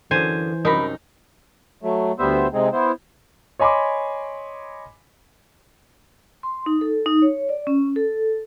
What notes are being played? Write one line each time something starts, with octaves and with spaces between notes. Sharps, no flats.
F#2 D3 E3 C5 G#5
C2 F#2 D#4 A#4 B5
F#3 A3
D2 G3 B3 C5 E5
C3 G#3 C4 D#4 G#4
B3 E4 C5
C#5 D#5 G#5 B5 C6 D6
C6
D#4
A4
D#4
C#5
D5
C#4
A4